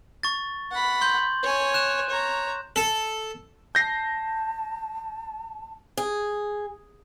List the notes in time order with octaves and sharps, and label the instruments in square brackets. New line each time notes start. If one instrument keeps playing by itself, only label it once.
[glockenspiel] C#6 A6
[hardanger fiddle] F#5 B5
[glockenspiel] C6 G6 F#7
[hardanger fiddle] C#5 G#5
[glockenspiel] F#6 E7
[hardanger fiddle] C#5 A#5
[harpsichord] A4
[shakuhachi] A5 [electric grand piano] G6 A#6 C7
[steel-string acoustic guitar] G#4